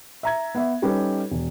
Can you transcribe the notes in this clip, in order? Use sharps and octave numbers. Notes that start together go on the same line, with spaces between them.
E5 A#5 G#6
B3 E5
G3 C#4 D#4 G4 A4 B4
E1